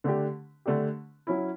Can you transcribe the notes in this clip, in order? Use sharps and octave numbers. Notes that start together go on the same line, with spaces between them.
D3 A3 D4 G4
D3 A3 D4 G4
F#3 C#4 E4